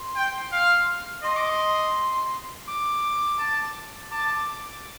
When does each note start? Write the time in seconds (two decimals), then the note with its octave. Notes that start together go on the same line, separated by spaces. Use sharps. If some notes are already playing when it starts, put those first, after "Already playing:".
Already playing: C6
0.16 G5
0.52 F5
1.24 D#5 C6
1.36 D6
1.50 C6
2.67 D6
3.39 A5
4.11 A5 D6